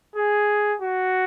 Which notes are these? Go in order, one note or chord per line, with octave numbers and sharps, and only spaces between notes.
G#4
F#4